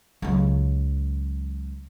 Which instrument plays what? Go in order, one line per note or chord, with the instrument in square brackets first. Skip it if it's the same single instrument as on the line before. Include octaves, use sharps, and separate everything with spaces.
[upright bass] C#2 F#3